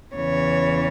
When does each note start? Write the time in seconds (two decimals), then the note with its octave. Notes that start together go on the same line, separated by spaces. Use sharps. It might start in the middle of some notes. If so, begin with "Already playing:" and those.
0.14 E2 C#3 E3 C#5